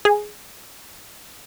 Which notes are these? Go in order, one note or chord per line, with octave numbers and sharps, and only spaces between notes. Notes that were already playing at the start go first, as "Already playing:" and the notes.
G#4